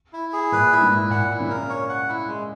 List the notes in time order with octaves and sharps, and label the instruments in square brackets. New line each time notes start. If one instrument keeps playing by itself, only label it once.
[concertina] E4
G#4
[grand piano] A#2 [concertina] B4
[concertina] E4
[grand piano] G#2
[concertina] E4
[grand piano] A#2 [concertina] F#5
[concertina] E4
[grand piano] C#3
[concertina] A#4
C#5
F#5
E4
G#3